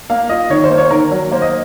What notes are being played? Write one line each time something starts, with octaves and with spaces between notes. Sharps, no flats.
A#3 F5
F4 D#5
D#3 C#5
C5
A#3
C#5
D#3 A#4
F#3 A#4
A#3 C5
D#5